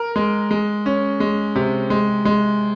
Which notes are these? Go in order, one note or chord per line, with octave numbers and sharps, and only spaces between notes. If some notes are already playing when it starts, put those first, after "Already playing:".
Already playing: A#4
G#3
G#3
C#4
G#3
C3
G#3
G#3